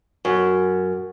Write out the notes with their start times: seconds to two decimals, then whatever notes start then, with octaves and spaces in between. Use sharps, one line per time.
0.25 F#2